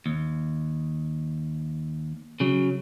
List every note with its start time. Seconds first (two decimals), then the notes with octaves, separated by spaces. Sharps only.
0.06 D#2
2.40 C#3 F#3